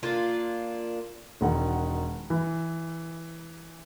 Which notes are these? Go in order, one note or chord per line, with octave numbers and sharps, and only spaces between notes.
A#3 D4 F4
E1 D#3 F#5
E3